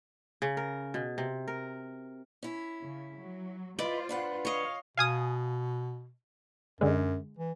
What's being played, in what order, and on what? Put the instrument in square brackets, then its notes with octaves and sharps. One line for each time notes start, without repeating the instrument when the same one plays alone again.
[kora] C#3
A#4
B2
C3
A#4
[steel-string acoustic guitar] C#4 E4
[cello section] C#3
F#3
[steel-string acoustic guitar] E4 B4 D#5 [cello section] F4 C5 [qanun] D5
[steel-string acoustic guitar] D4 B4 F#5
[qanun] C#5 D#5 [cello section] F5
[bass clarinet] B2 [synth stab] F5 G#5 D#6
[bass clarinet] F#2 [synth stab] D3 G#3
[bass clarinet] E3